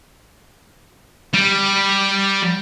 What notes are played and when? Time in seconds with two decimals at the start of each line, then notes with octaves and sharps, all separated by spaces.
1.34 G3